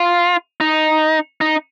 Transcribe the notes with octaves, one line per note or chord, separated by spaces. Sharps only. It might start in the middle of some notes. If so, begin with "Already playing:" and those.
Already playing: F4
D#4
D#4